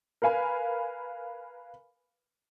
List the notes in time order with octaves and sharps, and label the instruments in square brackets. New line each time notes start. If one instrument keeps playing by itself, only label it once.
[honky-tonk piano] A#4 B4 F5 G#5 B5